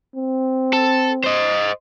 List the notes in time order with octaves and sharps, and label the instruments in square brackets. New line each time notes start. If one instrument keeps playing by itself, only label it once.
[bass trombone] C4
[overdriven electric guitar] A4
C5 D#5